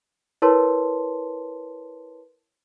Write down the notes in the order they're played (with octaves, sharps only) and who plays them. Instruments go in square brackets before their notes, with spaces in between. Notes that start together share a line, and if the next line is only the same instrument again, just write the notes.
[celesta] E4 A#4 B4 C#5 A5 C6